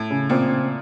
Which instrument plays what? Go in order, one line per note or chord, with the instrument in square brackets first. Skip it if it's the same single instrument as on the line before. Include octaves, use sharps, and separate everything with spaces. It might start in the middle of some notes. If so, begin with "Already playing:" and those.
Already playing: [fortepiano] A2
[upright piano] C#3
[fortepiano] A#2 [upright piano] C4
[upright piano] C#3